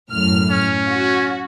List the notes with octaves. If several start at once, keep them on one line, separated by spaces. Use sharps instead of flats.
F#2 A2 F6
C#4
F#4